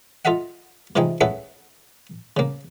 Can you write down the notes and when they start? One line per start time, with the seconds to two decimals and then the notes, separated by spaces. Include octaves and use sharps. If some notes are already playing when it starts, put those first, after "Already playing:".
0.25 F4 A4 D#5 E5 F#5
0.96 C3 E3 F3 D#4 G#4 G5
1.21 C#4 E4 G#4 A4 B4 F#5
2.37 C#3 A#3